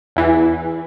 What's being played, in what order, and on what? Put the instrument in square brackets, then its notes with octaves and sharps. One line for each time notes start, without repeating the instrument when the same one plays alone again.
[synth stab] E2 E3